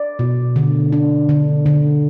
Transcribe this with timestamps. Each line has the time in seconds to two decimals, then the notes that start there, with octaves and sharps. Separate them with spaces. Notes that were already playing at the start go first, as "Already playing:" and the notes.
Already playing: D5
0.19 B2
0.56 D3
0.92 D4
1.29 D3
1.66 D3